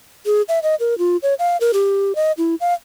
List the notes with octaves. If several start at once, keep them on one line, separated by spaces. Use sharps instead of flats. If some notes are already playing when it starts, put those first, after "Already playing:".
G#4
E5
D#5
A#4
F4
C#5
F5
A#4
G4
D#5
E4
F5